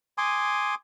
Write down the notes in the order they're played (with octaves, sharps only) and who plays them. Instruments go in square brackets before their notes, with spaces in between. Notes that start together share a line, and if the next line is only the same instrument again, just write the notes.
[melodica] G#5 C6 D6 D#6